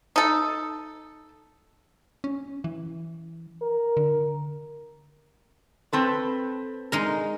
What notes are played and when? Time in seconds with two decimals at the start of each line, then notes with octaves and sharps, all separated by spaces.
0.16 D#4 A4
2.24 C#4
2.64 E3
3.62 A#4
3.97 D3
5.93 C4 A4 B4
6.92 G#3 D#4 A#4